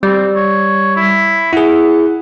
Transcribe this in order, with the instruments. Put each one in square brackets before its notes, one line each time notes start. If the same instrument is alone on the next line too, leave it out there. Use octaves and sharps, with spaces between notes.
[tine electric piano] G3 [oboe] C4
[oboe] C#5
E4
[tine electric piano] E4 G#4 [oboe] F#5